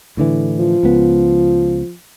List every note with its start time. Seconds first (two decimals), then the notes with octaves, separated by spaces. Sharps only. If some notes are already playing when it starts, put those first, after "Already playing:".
0.17 A2 D3 E3
0.59 F3
0.83 C#2 B3